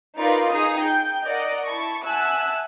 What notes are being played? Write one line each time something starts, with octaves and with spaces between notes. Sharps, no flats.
D#4 F4 A#4 B4 D5
D#4 G#4 D#6 C7
G5 G6
A#4 D5 D#5 F#5
E4 A5 C#6
E5 F#5 G#5 A5 E6 F#6